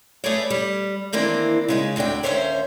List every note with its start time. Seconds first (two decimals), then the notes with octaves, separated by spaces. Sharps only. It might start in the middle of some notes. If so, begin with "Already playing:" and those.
0.24 A3 G#4 A4 B4 C#5 D5
0.50 G3
1.13 D#3 E3 A#3 C4 D4
1.68 C#3 G#3 D#4
1.96 D2 C3 D4 B4 G5
2.23 D#2 C3 C#4 C5 C#5 E5